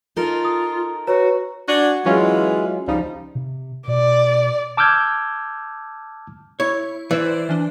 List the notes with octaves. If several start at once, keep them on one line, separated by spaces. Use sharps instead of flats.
D#4 F4 A4 A#4
D#6
F#4 B4 C#5 A#5
D4 F#4 F#5 G#5
E3 F#3 G#3 C#4 F4
C#2 F3 G3 D#4
C3
B2 D5
A5 D6 E6 F6 G6 G#6
E4 C#5
E3 C5 D5
E3 D4